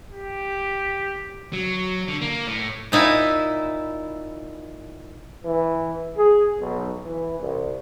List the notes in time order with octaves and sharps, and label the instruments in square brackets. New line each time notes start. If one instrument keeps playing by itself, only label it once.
[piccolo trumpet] G4
[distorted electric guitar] F#3
D3
A#3
A2
[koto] A#2 D#4 E4
[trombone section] E3
G#4
B1
E3
C2